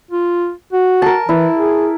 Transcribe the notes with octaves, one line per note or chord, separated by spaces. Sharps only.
F4
F#4
A#4 A5
E3 E4
G#4